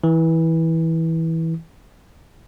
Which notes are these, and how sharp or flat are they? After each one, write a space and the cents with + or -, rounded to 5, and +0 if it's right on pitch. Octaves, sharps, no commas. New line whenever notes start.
E3 -20